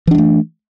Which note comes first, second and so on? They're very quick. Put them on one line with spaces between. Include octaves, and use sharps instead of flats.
E3 D4 F#3 A3